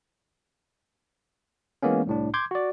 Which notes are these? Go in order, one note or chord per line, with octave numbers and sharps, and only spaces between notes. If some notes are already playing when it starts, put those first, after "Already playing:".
E3 G#3 A#3 B3 C#4
C2 A2 D4
C6 D6 G6 G#6
F#4 D5